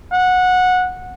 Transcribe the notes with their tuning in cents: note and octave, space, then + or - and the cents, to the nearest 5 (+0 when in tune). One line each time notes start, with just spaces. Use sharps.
F#5 -15